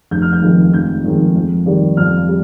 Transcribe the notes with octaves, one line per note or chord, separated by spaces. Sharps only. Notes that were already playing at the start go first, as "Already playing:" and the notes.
F1 G6
F6
G6
F2 D#3 G#3
F1 G6
F2 D#3 G#3
F2
D#3 G3
F2 F6
G3